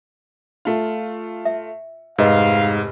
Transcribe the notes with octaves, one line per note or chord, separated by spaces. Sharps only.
A3 F4
E5
F1 G#2 B4 D#5 F5